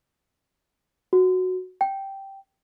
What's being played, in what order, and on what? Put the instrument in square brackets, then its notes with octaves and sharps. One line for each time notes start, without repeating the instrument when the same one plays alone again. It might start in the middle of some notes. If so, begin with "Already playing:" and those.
[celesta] F#4
G5